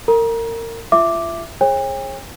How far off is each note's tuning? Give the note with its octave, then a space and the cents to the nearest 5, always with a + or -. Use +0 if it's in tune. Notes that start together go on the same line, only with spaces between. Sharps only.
A#4 -30 A#5 +30
F4 -25 E5 +10 D6 +0
G#4 +0 C#5 -40 G5 +45